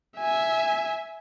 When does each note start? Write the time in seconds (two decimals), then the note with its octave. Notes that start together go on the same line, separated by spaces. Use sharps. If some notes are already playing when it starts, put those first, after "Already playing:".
0.18 E5 G#5